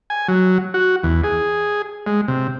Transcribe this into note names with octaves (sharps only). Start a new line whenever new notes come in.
G#5
F#3
F#4
E2
G#4
G#3
C3